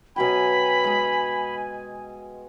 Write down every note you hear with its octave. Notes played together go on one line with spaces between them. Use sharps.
B2 F#3 G5 G#5 B5
G#3 G#4